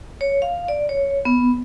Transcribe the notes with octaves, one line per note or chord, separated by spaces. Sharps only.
C#5
F5
D5
C#5
B3